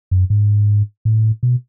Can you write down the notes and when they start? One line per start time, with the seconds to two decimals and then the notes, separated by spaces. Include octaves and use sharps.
0.11 F#2
0.30 G#2
1.05 A2
1.43 B2